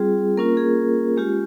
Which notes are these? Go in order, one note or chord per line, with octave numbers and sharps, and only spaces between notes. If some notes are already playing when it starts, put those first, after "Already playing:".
Already playing: G3 C4 F4 G#4
A#3 C#4 F4 A#4
G#4
G#3 C#4 F4 G4